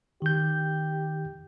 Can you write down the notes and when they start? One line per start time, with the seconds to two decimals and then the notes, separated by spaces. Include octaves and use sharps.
0.22 D#3 G4 G6